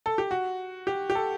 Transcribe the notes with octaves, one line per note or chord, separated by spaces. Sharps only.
A4
G4
F#4
G4
G4
A4